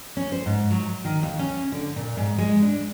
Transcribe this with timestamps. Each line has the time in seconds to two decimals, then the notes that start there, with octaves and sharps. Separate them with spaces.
0.17 C#4
0.32 C5
0.46 G#2
0.71 F#3
1.05 D#3
1.23 D#2
1.39 C#4
1.72 D3
1.96 A#2
2.17 G#2
2.38 G#3
2.62 D4